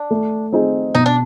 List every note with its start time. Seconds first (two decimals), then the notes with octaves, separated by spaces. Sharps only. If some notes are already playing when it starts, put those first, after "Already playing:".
Already playing: D4
0.10 A3
0.52 C4 D#4 G#4
0.95 B2 D#4
1.06 D4